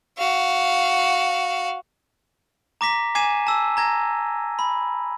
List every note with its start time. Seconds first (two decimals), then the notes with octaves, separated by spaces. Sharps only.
0.18 F#4 F5
2.81 A#5 D6 A#6 B6
3.15 G#5 D6 G#6 C7 D#7 E7
3.47 A5 E6
3.77 A#5 G#6 A#6
4.59 B5